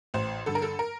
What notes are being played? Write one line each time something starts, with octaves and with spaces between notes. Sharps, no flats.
A1 C5
G2 D3 A4
A#4
A4
A#4